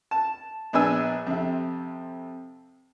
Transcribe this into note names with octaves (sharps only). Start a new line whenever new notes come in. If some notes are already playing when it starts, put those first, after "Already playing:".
A5
A#1 B3 D4 G#5 E6
F2 C3